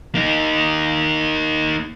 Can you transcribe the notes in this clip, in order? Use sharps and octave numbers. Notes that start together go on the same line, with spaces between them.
A#3 D#4